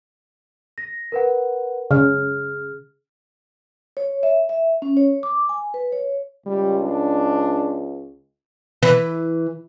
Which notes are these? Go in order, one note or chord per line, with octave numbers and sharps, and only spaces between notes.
A#6
A#4 B4 F#5
C#3 G#4 F6
C#5
E5
E5
C#4
C#5
D6
G#5
B4
C#5
C#2 G3
D4
E3 B4